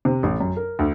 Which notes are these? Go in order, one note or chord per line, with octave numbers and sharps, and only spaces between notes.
C3
A1
F#2
A#4
D2